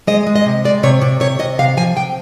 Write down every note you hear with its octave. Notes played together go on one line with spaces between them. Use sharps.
G#3 D#5
G#3
D#5
C3
G#3 D5
C3 C#5
C3 D5
C3 C#5
C3 D#5
C3 F5
F3 G#5
C3 G5